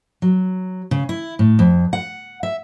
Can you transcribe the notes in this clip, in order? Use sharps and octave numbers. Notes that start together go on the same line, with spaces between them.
F#3
C#3
E4
A2
F2
F#5
E5